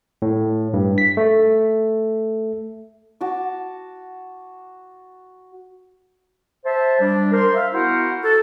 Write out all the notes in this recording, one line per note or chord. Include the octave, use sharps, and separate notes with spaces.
A2
G2
B6
A3
F#4 A5 D6
C5 E5 A5
G3 D4
A#4 C5 C6
E5 F5
B3 E4 F#4 A#4 C5 F#5
F#4 A4